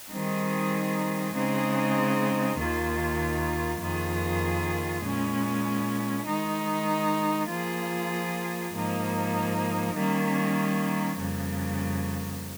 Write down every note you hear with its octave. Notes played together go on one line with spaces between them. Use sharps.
D#3 G3 C4 D#4 G#4
C#3 G#3 C4 D#4 G#4
D#2 D#3 A#3 F4
F2 D#3 A#3 F4 G#4
A#2 G#3 C#4
D#3 G#3 D#4
F3 A#3 F4 G#4
G#2 F3 A#3 D#4
D#3 G3 A#3 C#4
F2 C#3 G3 A#3